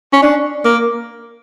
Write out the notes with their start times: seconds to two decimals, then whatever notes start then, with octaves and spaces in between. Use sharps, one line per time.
0.13 C#4
0.22 D4
0.65 A#3